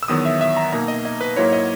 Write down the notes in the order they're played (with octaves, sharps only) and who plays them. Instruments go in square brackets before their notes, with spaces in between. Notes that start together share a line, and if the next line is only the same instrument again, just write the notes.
[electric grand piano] E6
E2 D#3 F#3 B3 D#6
E5
E5
A#5
B2 A#3 D#4 A#5
D#5
D#5
B4
G#2 F#3 A#3 E4 C#5
D#5